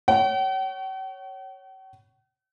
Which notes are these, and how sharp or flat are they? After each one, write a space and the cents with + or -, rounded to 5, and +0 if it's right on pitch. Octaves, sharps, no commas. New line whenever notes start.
C#5 +0 G5 -45